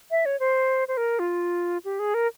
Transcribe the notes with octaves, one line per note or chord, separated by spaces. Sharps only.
E5
C#5
C5
C5
A#4
F4
G4
G#4
A#4